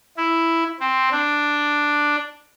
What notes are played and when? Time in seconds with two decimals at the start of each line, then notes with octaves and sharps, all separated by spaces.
0.17 E4
0.80 C4
1.12 D4